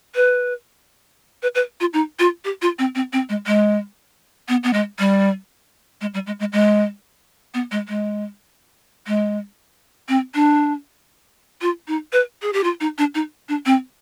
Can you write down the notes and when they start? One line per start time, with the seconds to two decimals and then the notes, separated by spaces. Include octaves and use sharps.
0.15 B4
1.43 B4
1.55 B4
1.80 F4
1.93 D#4
2.19 F4
2.45 G4
2.62 F4
2.79 C4
2.95 C4
3.13 C4
3.29 G#3
3.47 G#3
4.49 B3
4.63 B3
4.73 G#3
4.99 G3
6.01 G#3
6.14 G3
6.27 G#3
6.39 G#3
6.53 G#3
7.54 B3
7.71 G#3
7.88 G#3
9.07 G#3
10.09 C4
10.35 D4
11.62 F4
11.88 D#4
12.13 B4
12.42 G#4
12.53 G4
12.64 F4
12.80 D#4
12.98 D4
13.15 D#4
13.49 D4
13.66 C4